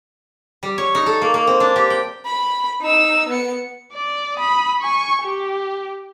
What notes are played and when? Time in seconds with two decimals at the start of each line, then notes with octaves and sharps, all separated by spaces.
0.63 G3
0.78 C#5
0.95 D#4
1.06 A4
1.22 A#3
1.34 A#3
1.47 C4
1.60 D4
1.76 G4
1.90 G5
2.26 B5
2.81 D#4 E6
3.29 B3 C#7
3.93 D5
4.37 B5 D#6
4.81 G#5 C#6
5.23 G4